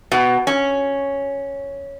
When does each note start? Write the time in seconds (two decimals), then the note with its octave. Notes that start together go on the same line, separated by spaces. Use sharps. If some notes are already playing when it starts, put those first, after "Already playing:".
0.12 B2
0.47 C#4